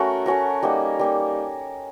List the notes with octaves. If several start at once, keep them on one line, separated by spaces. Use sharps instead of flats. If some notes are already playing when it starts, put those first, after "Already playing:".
Already playing: A3 C#4 F#4 A#4
A3 C#4 F#4 A#4
G3 A#3 D#4
G3 A#3 D#4